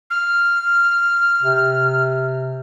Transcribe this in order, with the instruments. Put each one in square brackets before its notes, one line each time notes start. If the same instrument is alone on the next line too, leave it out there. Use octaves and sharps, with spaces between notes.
[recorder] F6
[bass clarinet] C3